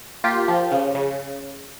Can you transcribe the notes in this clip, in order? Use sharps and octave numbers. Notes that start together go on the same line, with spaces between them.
A#3 F4 G4
F3
C#3
C#3